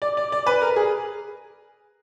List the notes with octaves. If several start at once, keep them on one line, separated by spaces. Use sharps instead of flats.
D5
D5
D5
B4
A#4
G#4